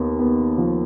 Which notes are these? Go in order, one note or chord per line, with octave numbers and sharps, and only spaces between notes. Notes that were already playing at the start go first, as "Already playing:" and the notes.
Already playing: D#2 B3
B3
F3